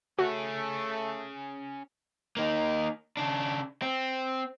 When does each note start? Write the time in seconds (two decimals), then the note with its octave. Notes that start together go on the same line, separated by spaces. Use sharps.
0.19 A3 C#4 F#4 G#4
2.37 A#3 D#4
3.17 C#3 D4
3.82 C4